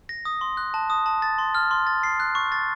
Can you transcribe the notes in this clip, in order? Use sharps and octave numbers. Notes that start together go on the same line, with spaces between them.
A#6
D#6
C6
F#6
A5
D#6
A5
A6
C6
F6
C6
A6
C7
F#6
C#6
A6